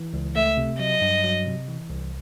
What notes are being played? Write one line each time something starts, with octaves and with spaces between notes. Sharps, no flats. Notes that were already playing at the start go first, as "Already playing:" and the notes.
Already playing: E3
C#2
A3 E5
C3
F#3 D#5
G2
F#3
C3
E3
C2